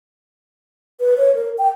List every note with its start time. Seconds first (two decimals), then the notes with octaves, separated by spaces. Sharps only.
1.00 B4
1.17 C#5
1.35 A#4
1.58 G5